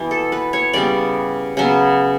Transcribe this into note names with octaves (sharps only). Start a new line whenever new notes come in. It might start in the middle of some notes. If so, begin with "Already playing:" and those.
Already playing: B2 E3 B3
A4
B4
C#5
C#3 G3 B3 D5
C#3 F#3 B3